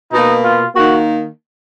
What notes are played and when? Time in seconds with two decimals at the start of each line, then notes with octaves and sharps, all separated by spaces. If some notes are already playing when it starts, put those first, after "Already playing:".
0.12 B2 A#3 D#4
0.43 F4
0.75 D#3 A#3 F#4